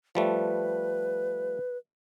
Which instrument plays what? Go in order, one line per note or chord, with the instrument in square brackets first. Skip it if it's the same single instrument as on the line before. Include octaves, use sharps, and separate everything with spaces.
[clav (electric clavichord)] F3 G3 A3 [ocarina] B4